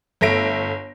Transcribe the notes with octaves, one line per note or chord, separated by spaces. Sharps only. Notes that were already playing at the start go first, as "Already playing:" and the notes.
G1 A3 E5 A#6 D7